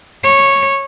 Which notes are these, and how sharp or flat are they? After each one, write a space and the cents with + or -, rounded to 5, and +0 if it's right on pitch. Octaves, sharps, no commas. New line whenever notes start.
C#5 -10